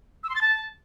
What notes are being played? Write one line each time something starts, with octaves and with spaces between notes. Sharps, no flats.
E6
C6
A6
A5